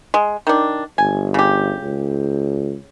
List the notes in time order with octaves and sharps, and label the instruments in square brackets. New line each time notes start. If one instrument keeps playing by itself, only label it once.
[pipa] G#3
D#3 D4
[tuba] G1 [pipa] G#5
[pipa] C#3 G4
[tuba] C#2